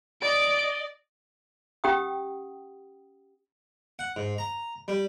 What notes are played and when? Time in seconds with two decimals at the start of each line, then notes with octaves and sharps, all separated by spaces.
0.21 D5 D#5 D7
1.84 C#4 G4 F#5 G5 D#6
3.99 F#5
4.16 G#2
4.38 A#5
4.88 G3